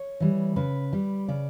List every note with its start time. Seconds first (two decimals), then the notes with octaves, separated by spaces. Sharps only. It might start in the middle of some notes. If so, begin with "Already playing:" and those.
Already playing: C#5
0.20 E3 G3
0.56 C#3 B4
0.93 G3
1.28 C#3 D5